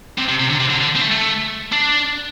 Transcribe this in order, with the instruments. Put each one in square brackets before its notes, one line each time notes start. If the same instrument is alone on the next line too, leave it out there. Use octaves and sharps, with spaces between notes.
[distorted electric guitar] C3
C3
C3
D3
C3
D3
D3
C4
A3
A3
D4